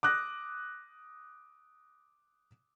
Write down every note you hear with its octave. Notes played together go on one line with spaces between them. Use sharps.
D6 D#6 F#6 A#6